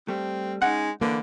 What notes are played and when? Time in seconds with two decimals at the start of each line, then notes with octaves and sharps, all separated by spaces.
0.08 G3 A3 C4
0.62 G#3 C#4 D#4 F#5
1.01 D3 E3 A#3 B4